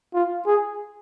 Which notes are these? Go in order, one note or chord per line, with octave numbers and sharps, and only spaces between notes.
F4
G#4